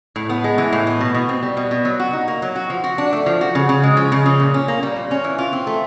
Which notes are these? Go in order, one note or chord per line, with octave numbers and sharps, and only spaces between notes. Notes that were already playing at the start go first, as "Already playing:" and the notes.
A2
B3
G#3
E3
A2
B3
B2
B2
C4
G3
B2
B2
F#3
F#4
D#4
A#3
F#3
F#4
F3
F#4
D4
A3
F3
F#4
C#3
C#3
G#3
F3
C#3
C#3
A#2
C#4
A#3
G3
A#2
C#4
E3
F4
C4
A3